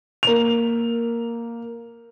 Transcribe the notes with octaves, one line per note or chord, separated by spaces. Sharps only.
A#3 F7